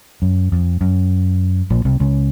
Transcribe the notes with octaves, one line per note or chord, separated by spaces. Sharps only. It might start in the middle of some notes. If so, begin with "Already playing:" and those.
F#2
F2
F#2
A#1 A#2
C2 C3
C#2 C#3